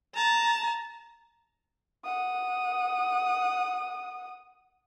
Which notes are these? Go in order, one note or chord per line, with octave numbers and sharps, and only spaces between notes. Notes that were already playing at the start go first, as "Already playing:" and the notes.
A5 A#5
F#5 D#6